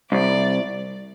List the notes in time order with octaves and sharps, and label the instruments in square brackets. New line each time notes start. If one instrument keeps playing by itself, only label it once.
[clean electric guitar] C2 [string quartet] D5